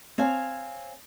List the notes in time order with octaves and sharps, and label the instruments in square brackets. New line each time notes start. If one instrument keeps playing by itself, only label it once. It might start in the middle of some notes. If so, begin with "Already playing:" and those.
[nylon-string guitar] C4 C#5 F5 G#5